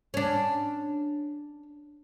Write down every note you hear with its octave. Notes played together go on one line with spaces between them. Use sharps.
C#4 D4